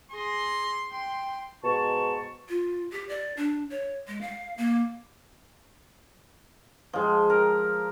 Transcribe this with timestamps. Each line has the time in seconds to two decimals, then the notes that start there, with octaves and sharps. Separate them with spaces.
0.11 G#4 C6 A#6
0.92 G5 C6
1.64 G#2 B2 A5 C#6
2.49 F4
2.92 G4
3.09 D5
3.37 D4
3.70 C#5
4.08 G#3
4.21 F5
4.58 A#3
6.93 F3 G#3
7.30 A#4